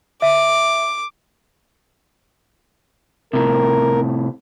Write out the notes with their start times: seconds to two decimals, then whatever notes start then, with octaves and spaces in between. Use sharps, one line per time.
0.22 E5 D6
3.33 A2 C3 A#4